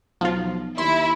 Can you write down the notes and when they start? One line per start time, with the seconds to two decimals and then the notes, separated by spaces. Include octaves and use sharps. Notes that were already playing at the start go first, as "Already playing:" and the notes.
0.21 B1 F3 F4
0.78 D#2 E4 C6